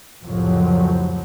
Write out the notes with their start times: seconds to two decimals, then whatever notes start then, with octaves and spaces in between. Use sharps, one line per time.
0.23 F#1 C2 F2 A2 F3 F#3